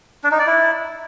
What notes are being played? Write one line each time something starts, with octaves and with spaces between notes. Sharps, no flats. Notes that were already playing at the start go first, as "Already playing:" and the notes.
D4
D#4
D5
E4